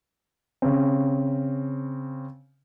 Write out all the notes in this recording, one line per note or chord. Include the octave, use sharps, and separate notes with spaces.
C#3 C4